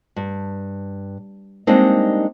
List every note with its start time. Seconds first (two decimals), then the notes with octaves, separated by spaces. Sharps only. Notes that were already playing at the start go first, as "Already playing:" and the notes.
0.16 G2
1.67 G3 G#3 A#3 C4 D4 D#4